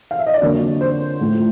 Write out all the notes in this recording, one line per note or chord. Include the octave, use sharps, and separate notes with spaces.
F5
E5
D#5
D5
F2 D3 F#3 A#3 C#5
C5
A2 F3 A3